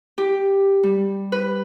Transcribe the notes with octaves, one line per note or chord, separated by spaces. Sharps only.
G4
G3
B4